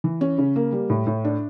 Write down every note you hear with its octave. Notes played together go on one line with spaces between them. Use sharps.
E3
C#4
C#3
A#3
G3
A2
A2
D4